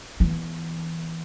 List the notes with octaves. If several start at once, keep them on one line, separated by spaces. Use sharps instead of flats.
E3 B3